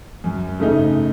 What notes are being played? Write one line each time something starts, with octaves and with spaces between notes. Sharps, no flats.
F#2
C#3 A3 D#4